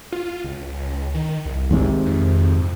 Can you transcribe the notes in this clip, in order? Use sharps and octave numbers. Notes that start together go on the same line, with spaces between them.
F4
C#2
D#3
C2
G#1 G#2 C3
F2